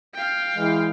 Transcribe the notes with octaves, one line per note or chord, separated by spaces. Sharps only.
F5 G5
E3 G#3